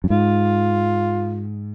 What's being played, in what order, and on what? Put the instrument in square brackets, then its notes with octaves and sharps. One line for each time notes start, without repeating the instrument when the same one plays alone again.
[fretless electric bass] F#2
[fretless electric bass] G#2 [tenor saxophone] F4